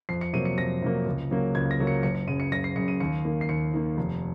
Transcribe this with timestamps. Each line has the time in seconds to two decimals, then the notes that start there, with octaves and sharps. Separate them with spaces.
0.09 F2 C7
0.21 C#7
0.33 C3 F#3 A#3 D#7
0.45 C#7
0.58 F2 A#6
0.82 C3 F#3 A#3
1.06 C#2
1.30 C#3 F#3 A#3
1.55 C#2 G#6
1.71 A#6
1.79 C#3 F#3 A#3
1.87 C#7
2.03 F#1 C#7
2.15 C#7
2.27 F#2 C#3 D#7
2.40 C#7
2.52 F#1 A#6
2.64 C7
2.76 F#2 C#3 C#7
2.88 D#7
3.00 D#2 C#7
3.25 D#3 A#3
3.41 C7
3.49 D#2 C#7
3.74 D#3 A#3
3.97 F1